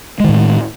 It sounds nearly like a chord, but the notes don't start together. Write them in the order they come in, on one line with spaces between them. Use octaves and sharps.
G#3 D#3 A2